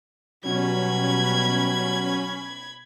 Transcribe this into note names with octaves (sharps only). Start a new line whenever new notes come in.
B2 F#3 G3 C#4 B5 G#6